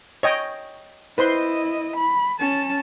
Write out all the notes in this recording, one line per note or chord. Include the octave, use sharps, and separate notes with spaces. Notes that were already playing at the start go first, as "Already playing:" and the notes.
C#5 D#5 G5
E4 B4 C5 D#5 C6
B5
C#4 A5